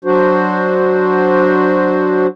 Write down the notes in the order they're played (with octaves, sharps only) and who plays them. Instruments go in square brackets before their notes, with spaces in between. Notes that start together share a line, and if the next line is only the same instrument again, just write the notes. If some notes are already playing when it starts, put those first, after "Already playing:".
[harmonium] F#3 D4 F#4 C5